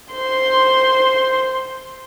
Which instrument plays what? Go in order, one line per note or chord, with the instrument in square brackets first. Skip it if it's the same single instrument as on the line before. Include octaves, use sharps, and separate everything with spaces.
[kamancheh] C5 C6